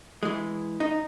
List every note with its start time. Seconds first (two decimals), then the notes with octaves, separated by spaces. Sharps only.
0.23 E3 G#3
0.80 D#4